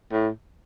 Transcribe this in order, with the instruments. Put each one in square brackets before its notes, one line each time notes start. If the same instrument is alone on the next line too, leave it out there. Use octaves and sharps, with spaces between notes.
[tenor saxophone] A2